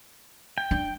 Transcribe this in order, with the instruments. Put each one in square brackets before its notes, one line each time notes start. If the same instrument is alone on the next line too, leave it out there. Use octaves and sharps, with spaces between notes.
[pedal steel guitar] G5
[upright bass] D4